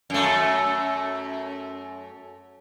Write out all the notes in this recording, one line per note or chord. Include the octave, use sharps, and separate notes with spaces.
F#2 A3